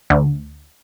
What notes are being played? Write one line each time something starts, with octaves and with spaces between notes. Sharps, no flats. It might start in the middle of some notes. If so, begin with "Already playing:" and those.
D2